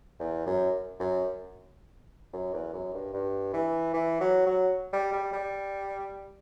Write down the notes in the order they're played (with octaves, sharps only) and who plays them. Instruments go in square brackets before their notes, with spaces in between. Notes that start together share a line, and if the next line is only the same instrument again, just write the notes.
[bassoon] E2
F#2
F#2
F#2
E2
F#2
G2
G2
E3
E3
F#3
F#3
G3
G3
G3